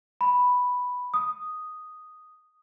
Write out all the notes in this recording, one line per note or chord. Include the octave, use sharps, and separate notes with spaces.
B5
D#6